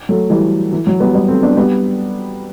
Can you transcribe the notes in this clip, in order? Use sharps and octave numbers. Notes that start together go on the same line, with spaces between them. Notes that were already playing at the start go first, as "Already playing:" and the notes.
F#3 A3
E3 G3
E3
F#3
G3 B3
G3 B3
A3 C4
B3 D4
G3 B3